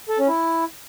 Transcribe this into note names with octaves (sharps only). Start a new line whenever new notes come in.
A4
C#4
E4